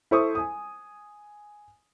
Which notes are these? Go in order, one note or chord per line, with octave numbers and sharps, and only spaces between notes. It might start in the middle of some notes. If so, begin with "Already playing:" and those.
E4 A4 C5 C#6 D#6
G#5 D#6